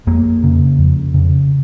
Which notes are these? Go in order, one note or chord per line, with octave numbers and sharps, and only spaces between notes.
F2 A#3
C#3
F2
C#3